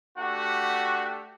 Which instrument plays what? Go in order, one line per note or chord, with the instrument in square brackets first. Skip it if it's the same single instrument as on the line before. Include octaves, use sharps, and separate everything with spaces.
[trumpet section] A3 D4 F#4 G4 F#5